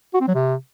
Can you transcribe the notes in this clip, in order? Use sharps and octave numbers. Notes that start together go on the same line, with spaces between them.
F#4
C4
F#3
C3